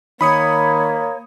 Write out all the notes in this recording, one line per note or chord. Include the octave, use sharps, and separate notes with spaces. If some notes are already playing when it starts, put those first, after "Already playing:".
D#3 A#3 C#5 B5 D#6 C#7